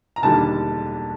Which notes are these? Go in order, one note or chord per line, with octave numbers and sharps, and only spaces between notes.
A#5
E1 D#2 D3 G3 A#3 A5